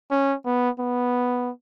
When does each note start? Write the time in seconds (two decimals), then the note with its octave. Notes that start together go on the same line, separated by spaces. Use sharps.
0.11 C#4
0.46 B3
0.80 B3